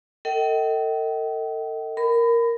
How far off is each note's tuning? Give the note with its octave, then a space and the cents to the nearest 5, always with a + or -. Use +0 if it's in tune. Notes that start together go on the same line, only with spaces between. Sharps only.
A4 +40 D#5 +30 G5 -40
A#4 +0 B5 +25